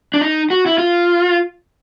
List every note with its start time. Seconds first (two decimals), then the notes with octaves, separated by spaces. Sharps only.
0.14 D4
0.21 D#4
0.50 F#4
0.66 E4
0.78 F4